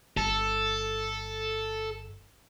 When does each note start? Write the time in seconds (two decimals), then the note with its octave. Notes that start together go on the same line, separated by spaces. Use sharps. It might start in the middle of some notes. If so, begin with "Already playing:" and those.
0.17 G1 A4